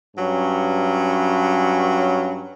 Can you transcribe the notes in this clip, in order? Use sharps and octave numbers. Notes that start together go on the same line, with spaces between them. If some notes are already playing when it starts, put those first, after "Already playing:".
G2 F#3 C#4